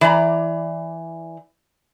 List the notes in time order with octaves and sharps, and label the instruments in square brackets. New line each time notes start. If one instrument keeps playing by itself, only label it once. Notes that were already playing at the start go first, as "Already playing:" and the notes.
[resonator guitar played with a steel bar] E3 D5 A#5